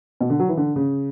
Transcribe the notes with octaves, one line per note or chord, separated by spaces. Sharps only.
B2
D3
F#3
E3
D3
C#3